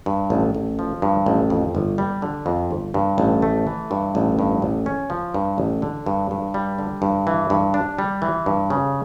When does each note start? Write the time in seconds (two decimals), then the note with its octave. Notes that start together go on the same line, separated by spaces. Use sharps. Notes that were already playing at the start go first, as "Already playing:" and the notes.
0.06 G2
0.30 A1
0.55 A1
0.79 F3
1.02 G2
1.26 A1
1.50 F2
1.75 G1
1.98 G3
2.22 D3
2.46 F2
2.71 G1
2.94 G2
3.18 A1
3.42 A3
3.67 E3
3.91 G2
4.15 A1
4.39 G2
4.62 A1
4.86 C#4
5.10 F3
5.34 G2
5.58 A1
5.82 D3
6.06 G2
6.31 G2
6.54 G3
6.79 D3
7.02 G2
7.27 E3
7.50 G2
7.74 D4
7.99 G3
8.22 E3
8.46 G2
8.70 C#3